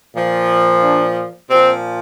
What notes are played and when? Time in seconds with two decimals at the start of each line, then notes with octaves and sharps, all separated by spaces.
0.15 A#2 F3
0.83 D4
1.50 A#2 F3 C4